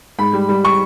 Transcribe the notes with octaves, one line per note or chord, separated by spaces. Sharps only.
G#2 B5
G3
G3
C#6